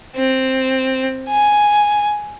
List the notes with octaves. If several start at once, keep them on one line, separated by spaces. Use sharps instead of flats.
C4
G#5